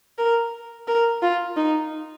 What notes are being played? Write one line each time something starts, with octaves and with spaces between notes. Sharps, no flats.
A#4
A#4
F4
D#4